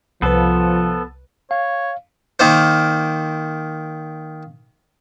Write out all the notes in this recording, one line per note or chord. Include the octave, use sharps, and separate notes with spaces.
C2 F3 B3 A4 B4
C#5 F5
D#3 A#3 C5